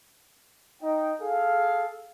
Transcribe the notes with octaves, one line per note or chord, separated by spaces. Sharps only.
D#4 D#5 G5
G#4 A4 F5